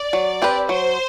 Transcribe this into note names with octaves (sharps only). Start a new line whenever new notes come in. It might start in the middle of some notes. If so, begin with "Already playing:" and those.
Already playing: D5
F#3
C4 G4 B4
F#3 C5